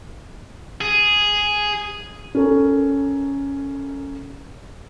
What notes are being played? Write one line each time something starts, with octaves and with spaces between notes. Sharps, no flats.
G#4
C#4 A4 A#4